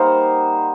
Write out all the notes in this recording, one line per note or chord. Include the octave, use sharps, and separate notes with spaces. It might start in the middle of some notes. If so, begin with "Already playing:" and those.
Already playing: G3 A#3 D#4 A#4 C5 F#5